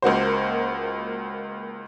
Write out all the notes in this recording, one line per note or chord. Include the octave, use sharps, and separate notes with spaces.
C#2 A#3 F#4 C5